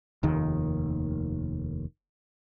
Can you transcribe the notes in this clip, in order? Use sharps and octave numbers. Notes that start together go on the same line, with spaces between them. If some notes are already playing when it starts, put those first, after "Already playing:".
F1 D#2 D#3